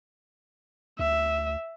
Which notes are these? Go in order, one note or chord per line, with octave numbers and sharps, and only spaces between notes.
D2 E5